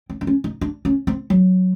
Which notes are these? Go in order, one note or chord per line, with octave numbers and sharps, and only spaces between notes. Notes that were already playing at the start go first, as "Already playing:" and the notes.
C4
D4
C#4
D#4
D4
C#4
C4
F#3